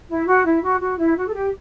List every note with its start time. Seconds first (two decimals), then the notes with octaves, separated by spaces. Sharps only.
0.09 E4
0.26 F#4
0.45 E4
0.63 F#4
0.80 F#4
0.97 E4
1.16 F#4
1.27 A4
1.33 G4